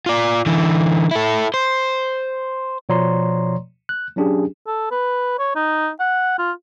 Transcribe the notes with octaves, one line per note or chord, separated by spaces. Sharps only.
F4 D5
D3 E3
E4 A4
C5
B2 F3 C#5 D5 A#5 C6
F#6
F#3 C#4 D4 G4 G#4
A4
B4
C#5
D#4
F#5
F4